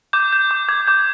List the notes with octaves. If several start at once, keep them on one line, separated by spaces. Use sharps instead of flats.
D6 G6
G6
D6
D6 G#6
D6 G6